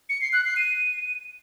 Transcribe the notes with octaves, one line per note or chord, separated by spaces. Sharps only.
C#7
C7
F#6
C7
D#7